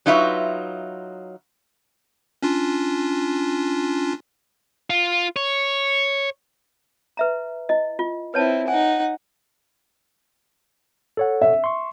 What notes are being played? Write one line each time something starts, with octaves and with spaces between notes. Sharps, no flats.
F#3 D#4 F4 B4 E5
C#4 D4 F4
F4
C#5
B4 E5 A#5
E4 D#5
F4
C4 E4 B4 C#5 A5
D#4 F#5 G#5
A4 C#5 F#5
E5
C6 C#6